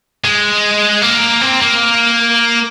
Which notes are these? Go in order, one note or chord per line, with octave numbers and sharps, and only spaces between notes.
G#3
A#3
C4
A#3